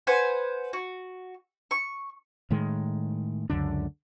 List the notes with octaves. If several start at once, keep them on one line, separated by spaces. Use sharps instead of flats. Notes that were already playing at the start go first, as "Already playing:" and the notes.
B4 C5 F#5 G#5
F#4
C#6
A2 D#3 G#3
C#2 F#2 D3 D4